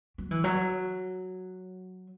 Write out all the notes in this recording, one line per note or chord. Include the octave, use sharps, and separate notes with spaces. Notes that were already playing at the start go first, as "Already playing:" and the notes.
F#3
E3
F#3